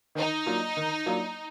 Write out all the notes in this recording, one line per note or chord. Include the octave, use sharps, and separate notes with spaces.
D#3 D#4
F#3 A#3 D4 F4
D#3
F#3 A#3 D4 F4